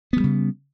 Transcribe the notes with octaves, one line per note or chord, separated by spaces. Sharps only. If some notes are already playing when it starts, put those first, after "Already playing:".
C#3 F3 G3 B3